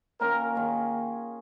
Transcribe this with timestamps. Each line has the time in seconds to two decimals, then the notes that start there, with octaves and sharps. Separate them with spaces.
0.21 D#3 A#3 C#4 F4 A#4
0.55 D#3 A#3 C#4 G#4